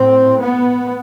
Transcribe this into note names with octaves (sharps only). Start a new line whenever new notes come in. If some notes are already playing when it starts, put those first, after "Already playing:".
Already playing: A2 C4
B3